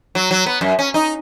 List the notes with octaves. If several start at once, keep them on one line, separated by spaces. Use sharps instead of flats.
F#3
F#3
B3
F#2
C#4
D#4